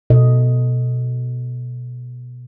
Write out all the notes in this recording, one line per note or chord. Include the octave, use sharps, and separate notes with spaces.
B2 A4 D#5